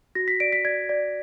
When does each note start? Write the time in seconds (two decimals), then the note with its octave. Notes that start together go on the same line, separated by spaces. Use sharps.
0.15 F#4 A#6
0.28 B6
0.40 D5 D7
0.52 B6
0.65 D5 G#6
0.89 D5